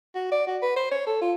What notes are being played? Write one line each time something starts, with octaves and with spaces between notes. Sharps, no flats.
F#4
D5
F#4
B4
C5
C#5
A4
F4